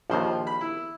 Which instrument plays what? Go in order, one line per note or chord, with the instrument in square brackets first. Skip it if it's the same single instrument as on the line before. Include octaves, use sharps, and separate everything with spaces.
[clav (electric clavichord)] A#1 D#2 [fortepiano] F3 C5
[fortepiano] B5
E4